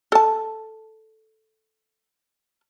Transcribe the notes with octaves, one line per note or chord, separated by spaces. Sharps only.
A4 A5